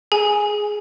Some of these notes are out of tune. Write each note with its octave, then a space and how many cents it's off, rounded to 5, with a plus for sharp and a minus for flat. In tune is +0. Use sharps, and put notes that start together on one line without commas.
G#4 +5 G#5 +0